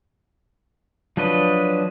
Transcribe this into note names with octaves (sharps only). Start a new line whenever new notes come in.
F3 F#3 D4 B4 D#5